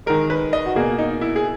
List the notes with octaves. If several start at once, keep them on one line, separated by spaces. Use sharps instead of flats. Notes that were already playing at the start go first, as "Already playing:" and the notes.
D#3 G#3 A#4
B4
D#5
F#4
B2 A#3 G#4
D#4
E4
G#4